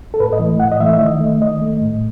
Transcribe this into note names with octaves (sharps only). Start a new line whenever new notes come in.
A4
A2 B4
D#5
E3 A3
A2 F#5
D#5
E3 A3 E5
E5
D#3 D#5
A3
D#3 D#5
A3
A2